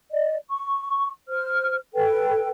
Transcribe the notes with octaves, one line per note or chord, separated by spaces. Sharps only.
D5 D#5
C#6
C5 F6
A4 B4 G5